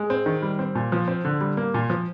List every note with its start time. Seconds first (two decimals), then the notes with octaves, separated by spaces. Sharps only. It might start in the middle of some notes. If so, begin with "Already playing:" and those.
Already playing: G#3
0.10 C4
0.26 D#3
0.42 G3
0.59 C4
0.75 A#2
0.92 F3
1.08 C4
1.25 D3
1.41 G3
1.57 A#3
1.74 A#2
1.90 F3